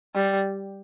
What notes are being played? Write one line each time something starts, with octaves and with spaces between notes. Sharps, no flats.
G3